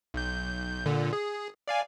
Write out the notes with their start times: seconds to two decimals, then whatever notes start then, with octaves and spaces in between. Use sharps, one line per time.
0.14 B1 G6
0.86 A#2 D3
1.13 G#4
1.68 D5 F5 G#5